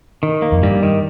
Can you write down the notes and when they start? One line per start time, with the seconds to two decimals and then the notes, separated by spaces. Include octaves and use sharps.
0.23 D#3
0.42 A#3
0.52 F2
0.63 G2 G3
0.83 D#3